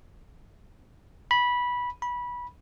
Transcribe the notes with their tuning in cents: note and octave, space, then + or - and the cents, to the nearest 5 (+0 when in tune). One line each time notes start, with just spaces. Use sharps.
B5 -15
B5 -20